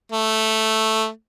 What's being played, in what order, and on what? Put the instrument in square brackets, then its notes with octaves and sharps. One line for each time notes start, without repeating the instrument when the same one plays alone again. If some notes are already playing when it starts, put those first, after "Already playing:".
[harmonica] A3